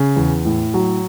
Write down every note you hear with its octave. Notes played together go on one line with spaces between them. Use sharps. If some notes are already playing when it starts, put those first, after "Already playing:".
Already playing: C#3
E2
A2
F#3